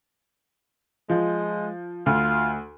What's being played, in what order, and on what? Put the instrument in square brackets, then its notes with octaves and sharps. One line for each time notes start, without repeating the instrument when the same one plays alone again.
[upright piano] F3 [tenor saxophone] G#3
[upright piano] D2 [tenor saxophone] F4